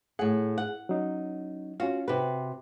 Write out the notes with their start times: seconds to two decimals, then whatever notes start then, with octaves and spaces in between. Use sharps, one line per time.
0.19 A2 G#4 F#5
0.58 F#5
0.89 F#3 C#4 D#4
1.80 C#4 F4 F#4 F5
2.08 C3 F#4 B4